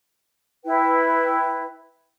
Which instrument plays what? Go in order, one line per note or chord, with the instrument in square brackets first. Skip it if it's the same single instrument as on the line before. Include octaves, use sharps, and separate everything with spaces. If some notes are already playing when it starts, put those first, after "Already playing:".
[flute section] E4 B4 G5